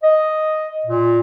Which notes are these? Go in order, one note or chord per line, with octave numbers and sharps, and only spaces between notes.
D#5
A#2